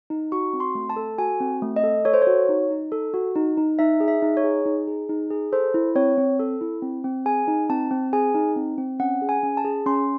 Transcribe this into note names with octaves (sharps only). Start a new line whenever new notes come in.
D#4
F#4 C#6
C4
C6
A3
A5
A4
F#4 G#5
C4
A3
D#5
A4
A4 C#5
C5
F#4 C#5
D#4
D#4
A4
F#4
D#4
D#4
D#4 E5
G#4
E5
D#4
C#5
G#4
D#4
G#4
D#4
G#4
A4 C5
E4
C4 C#5
C4
A4
E4
C4
C4
G#4 G#5
D#4
C4 A5
C4
G#4 G#5
D#4
C4
C4
C#4 F#5
G#4
G#5
C#4
A5
G#4
C#4 C6